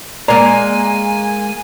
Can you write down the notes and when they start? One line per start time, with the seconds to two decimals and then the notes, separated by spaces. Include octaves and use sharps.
0.28 G#3 A#3 D5 G#5 A#5